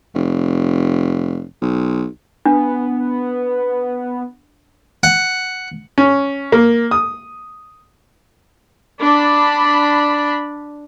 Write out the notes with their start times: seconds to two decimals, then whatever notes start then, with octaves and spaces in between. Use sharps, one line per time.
0.15 F1
1.62 B1
2.46 B3 D4
5.03 F#5
5.98 C#4
6.52 A#3
6.91 D#6
9.01 D4 B5